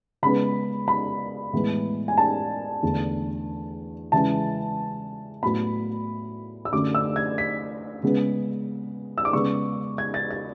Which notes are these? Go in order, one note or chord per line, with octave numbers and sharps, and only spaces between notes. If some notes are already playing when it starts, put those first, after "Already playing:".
C#3 G#3 B3 B5
B5
A2 E3 G#3 B3
G#5
A5
E2 D3 A3
C#3 E3 G#3 A5
A2 F#3 B3 B5
E6
F#2 D3 A3 D6
E6
G#6
B6
C#3 G#3 B3
E6
D6
C#3 G#3 B3 C#6
G#6
A6
A6